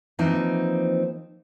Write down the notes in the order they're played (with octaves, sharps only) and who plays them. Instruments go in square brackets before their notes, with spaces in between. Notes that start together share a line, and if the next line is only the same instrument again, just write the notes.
[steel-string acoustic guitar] E3 F3 A#3 C4 D#4 C5